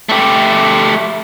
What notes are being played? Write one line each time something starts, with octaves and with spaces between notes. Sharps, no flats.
A3 G4